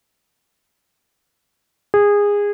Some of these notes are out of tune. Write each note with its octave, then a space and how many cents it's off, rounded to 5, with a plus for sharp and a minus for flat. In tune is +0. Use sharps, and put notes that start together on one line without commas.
G#4 -20